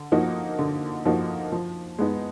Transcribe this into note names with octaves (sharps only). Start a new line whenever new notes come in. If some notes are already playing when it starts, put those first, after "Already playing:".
Already playing: D3
F3 A#3 D#4 F#4
D3
F3 A#3 D#4 F#4
F3
G#3 B3 D#4